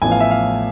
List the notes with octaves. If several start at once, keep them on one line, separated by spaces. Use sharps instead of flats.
A1 A2 F3 B3 G#5
F5
E5
F5